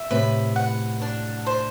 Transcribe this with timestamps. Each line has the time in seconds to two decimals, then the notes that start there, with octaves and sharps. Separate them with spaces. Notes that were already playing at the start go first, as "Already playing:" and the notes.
Already playing: E5
0.11 A2 C3 B4
0.56 F#5
1.02 D4
1.47 C5